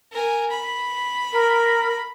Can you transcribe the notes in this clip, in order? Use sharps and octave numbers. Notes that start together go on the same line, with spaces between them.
A#4 G#5
B5
A#4